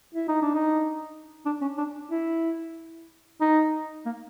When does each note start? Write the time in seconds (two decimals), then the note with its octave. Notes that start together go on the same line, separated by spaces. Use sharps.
0.15 E4
0.28 D#4
0.42 D4
0.55 D#4
1.46 D4
1.61 C#4
1.78 D4
2.11 E4
3.41 D#4
4.06 A#3